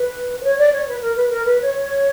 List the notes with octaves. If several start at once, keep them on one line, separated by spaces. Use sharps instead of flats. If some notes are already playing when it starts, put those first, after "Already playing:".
Already playing: B4
B4
C#5
D5
C#5
B4
A#4
B4
A#4
B4
C#5